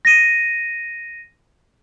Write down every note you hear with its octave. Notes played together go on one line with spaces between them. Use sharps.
A#6 D#7